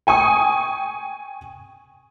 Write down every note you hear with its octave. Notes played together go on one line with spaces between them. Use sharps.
G5 G#5 C#6 D#6